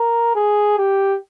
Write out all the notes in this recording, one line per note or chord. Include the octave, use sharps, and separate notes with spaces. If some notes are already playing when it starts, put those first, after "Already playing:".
Already playing: A#4
G#4
G4